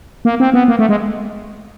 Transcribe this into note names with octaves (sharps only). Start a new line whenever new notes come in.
A#3
C4
B3
A#3
A3
G#3